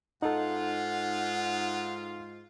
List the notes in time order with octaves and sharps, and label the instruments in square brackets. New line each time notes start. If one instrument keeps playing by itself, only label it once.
[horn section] G#2 F4 [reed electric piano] D#4 A4 [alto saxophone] F#5